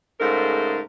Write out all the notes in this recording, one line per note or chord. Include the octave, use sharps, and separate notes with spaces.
G#2 C#3 A3 A#4 C5